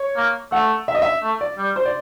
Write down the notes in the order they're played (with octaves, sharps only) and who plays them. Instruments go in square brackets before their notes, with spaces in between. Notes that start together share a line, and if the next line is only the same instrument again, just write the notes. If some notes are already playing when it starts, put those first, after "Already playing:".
Already playing: [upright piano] C#5
[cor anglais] A#3
[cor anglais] A3 [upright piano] F#5
[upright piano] E5
D#5
E5
[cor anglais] A3
[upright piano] D5
[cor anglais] G3
[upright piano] C5
D5